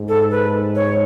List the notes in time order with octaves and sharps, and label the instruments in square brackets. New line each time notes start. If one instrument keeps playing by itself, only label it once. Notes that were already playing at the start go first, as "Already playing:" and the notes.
Already playing: [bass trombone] G#2
[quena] A4
B4
C#5